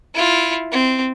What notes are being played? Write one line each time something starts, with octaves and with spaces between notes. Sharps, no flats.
E4 F4
C4